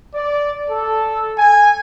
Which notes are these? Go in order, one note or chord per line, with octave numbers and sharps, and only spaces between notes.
D5
A4
G#5